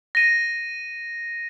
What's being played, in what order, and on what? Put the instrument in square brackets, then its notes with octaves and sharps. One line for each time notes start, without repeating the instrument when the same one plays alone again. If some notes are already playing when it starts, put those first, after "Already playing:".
[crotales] A#6 D#7